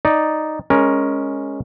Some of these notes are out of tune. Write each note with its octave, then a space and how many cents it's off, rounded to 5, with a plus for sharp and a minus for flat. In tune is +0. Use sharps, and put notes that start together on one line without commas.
D#4 +0 D5 +0
G#3 +0 C#4 +0 A#4 +10